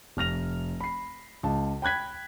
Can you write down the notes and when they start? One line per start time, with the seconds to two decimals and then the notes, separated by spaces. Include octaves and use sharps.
0.17 F1 F6 A#6 F7
0.81 B5 C7
1.43 C#2 A5
1.82 G5 B5 F#6 G#6 B6